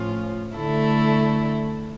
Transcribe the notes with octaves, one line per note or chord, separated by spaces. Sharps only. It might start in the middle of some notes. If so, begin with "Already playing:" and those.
Already playing: A2 F3 C#4 F4
D3 A3 E4 A4